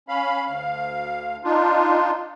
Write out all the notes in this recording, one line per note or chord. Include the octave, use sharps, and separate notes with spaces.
C#4 F5 B5
D2 F5
D4 D#4 F4